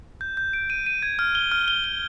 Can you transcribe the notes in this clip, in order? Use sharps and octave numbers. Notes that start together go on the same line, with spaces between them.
G6
G6
D7
D#7
D#7
G#6
F6
G7
F6
G7
G7